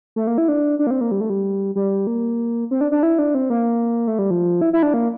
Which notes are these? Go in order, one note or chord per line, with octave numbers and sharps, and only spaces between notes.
A3
A#3
E4
D4
D4
A#3
C4
A#3
G3
A3
G3
G3
A#3
C4
D4
D4
E4
D4
C4
A#3
A3
G3
F3
E4
E4
D4
A#3